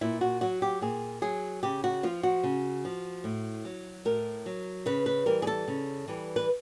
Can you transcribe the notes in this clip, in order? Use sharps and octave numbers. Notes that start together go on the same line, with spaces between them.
A#2 E4
F#4
F#3 F#4
G4
A#2 G#4
F#3 G#4
C#3 G4
F#4
F3 F4
F#4
C#3
F3
A2
F#3
A2 A#4
F#3
C#3 B4
B4
E3 G3 A#4
G#4
A4
C#3
E3 G3
B4